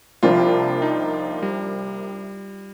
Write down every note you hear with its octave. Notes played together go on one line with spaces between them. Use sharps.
C2 C3 F3 A#3 D4 F4
D#4
G3